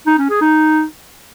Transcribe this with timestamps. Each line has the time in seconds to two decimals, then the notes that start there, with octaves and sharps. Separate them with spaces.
0.07 D#4
0.18 C#4
0.30 G#4
0.41 D#4